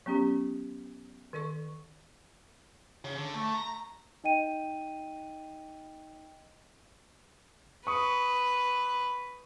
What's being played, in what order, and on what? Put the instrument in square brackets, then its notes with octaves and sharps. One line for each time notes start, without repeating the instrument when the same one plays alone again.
[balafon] F#3 B3 C#4 G4
D#3 A4 D5 C#6
[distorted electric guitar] C#3
D3
A3
A#5
[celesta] D#4 D#5 G5 D#7
[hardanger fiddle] B4 [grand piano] C#6 D#6